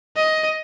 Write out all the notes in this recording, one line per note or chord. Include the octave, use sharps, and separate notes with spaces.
D#5